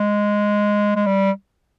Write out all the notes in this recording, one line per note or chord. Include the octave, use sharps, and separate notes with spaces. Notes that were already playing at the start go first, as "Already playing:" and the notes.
Already playing: G#3
G#3
G3